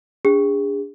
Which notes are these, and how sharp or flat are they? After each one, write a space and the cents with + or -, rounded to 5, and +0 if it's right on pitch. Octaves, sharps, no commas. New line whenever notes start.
D4 -30 G#4 -30